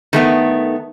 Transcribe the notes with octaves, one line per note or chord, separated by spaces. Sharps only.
D#3 A3 B3